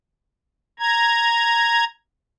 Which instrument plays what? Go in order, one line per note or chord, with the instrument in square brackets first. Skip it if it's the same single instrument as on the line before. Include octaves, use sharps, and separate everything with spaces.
[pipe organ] A#5 G#6